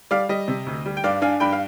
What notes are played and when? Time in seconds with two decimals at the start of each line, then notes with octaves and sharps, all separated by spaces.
0.11 G3 D5 F5
0.29 G3 D#5
0.48 C3
0.66 D2
0.86 G3
0.97 G5
1.04 G2 D5 F5
1.22 D4 F5 G#5
1.40 G2 G5 B5
1.53 F5